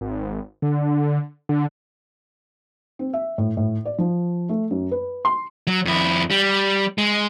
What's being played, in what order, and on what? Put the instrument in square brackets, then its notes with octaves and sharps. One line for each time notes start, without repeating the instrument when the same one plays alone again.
[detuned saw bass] G#1
D3
D3
[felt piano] C4
E5
A2
A2
D5
F3
A3
F#2
B4
C6
[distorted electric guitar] F#3
F2 E4
G3
G#3